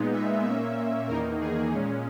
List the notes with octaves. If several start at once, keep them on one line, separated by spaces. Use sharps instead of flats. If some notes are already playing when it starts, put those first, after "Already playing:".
Already playing: A#2 G#3 B3 D#4
E5
A#2 A#3 C#4 E5
E2 D#3 A#3 D#4 A#4
G#4
A#2 G#3 C#4